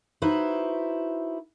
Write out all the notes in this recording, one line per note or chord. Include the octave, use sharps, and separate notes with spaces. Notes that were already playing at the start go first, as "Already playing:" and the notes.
D#4 E4 F#4 B4 C5